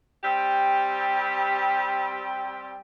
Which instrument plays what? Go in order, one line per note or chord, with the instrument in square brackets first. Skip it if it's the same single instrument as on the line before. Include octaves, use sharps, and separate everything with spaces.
[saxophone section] G3 C4 G4